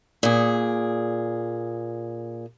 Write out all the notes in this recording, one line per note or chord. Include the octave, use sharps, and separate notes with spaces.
A#2 G#4